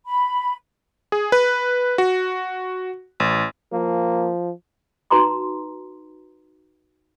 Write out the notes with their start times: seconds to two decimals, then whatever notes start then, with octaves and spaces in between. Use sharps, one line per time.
0.06 B5
1.12 G#4
1.32 B4
1.98 F#4
3.20 A1
3.72 F3 A#3
5.10 D#4 F#4 B4 A#5 C6 D6